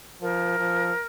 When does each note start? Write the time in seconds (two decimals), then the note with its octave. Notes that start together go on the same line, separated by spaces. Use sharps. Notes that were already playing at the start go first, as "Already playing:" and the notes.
0.22 F3 A#4
0.59 F3